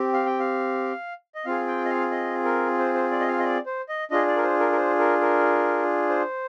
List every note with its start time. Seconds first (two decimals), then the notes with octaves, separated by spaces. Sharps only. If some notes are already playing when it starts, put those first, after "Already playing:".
Already playing: C4 G4
0.13 F5
0.26 G5
0.39 F5
1.35 D#5
1.45 C4 F4 G#4 F5
1.68 G5
1.85 D#5
1.89 F5
2.11 D#5
2.44 A#4
2.79 C5
2.94 C5
3.11 D5
3.20 D#5
3.28 F5
3.39 D#5
3.44 D5
3.66 C5
3.89 D#5
4.11 D4 F4 G#4 D#5
4.27 D5
4.36 A#4
4.43 C5
4.60 A#4
4.72 A#4
4.77 C5
4.99 A#4
5.21 A#4
6.09 C5